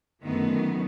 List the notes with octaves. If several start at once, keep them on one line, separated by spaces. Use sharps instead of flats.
F#2 D3 D#3 F#3 A3 B3